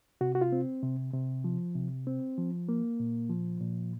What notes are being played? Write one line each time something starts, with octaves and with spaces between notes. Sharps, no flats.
C3 F#4
F#4
F4
C4
C3
C3
F3
C3
C4
F3
A#3
A#2
F3
A#2